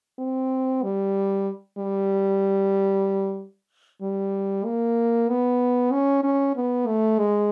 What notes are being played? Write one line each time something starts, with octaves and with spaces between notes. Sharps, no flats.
C4
G3
G3
G3
A#3
B3
C#4
C#4
B3
A3
G#3